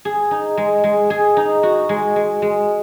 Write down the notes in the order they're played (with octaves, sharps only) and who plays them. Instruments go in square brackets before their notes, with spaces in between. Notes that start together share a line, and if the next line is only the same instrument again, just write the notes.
[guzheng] G#4
D#4
G#3
G#3
G#4
D#4
F#4
G#3
G#3
G#3